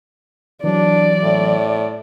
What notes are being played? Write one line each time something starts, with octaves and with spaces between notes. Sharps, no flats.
E3 F#3 D4 D5
A2